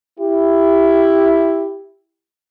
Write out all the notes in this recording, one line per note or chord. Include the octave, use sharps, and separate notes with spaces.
E4 G4